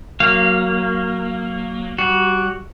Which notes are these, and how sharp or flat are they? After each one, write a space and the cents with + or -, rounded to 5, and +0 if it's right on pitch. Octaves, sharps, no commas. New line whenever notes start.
F#3 +0 A#3 +0 F5 -20
G3 -20 F#4 +0